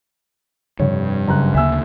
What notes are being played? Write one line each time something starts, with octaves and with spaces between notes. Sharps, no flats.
F1 G2 C#5
F#1 A#5 F#6
D2 C#3 A#3 E5 G#5 E6